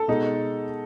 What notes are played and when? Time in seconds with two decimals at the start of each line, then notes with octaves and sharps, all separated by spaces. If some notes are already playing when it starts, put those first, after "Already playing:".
Already playing: A4
0.08 B2 G#3 D#4